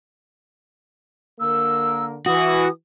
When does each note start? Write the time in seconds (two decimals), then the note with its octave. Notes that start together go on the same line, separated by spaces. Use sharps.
1.40 D3 A#3 A#4 E6
2.26 E3 F#4 D#6